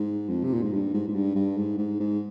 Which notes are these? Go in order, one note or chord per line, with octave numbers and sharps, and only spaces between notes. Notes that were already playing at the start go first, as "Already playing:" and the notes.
Already playing: G#2
F2
C3
A#2
G#2
G2
G#2
G#2
G2
G2
G#2
G#2
G#2